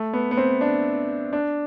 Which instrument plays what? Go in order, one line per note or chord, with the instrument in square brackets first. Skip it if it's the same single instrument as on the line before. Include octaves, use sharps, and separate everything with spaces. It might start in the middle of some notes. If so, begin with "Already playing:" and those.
Already playing: [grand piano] A3
B3
B3
C4
D4
D4